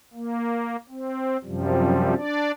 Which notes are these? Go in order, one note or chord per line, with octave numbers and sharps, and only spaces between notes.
A#3
C4
F#2 C3 F3 G3
D4 D5